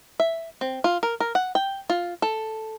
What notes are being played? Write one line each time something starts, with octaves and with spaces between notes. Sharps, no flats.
E5
C4
F4
A#4
A#4
F#5
G5
F4
A4